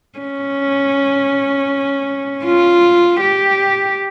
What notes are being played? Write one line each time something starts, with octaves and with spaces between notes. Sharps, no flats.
C#4
F4
G4